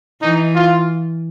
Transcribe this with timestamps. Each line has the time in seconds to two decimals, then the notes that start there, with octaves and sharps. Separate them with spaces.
0.21 E3 D#4
0.55 F4